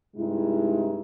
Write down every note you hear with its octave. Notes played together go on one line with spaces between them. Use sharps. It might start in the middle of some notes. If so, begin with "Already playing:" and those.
G2 C3 G#3 D#4 E4